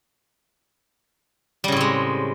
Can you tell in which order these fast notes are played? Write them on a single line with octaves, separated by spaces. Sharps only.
G3 C#3 A2 C4 G#3